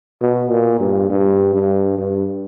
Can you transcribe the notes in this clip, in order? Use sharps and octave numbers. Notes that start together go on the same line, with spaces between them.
B2
A#2
G2
G2
G2
G2